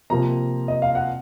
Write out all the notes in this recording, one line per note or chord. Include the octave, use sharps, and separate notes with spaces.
C3 F3 A#3 A#5
D#5
F5
F#5